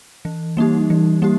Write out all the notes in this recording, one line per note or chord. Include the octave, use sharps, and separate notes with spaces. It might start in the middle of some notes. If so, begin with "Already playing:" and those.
E3
G3 A#3 D#4 G4
E3
G3 A#3 G4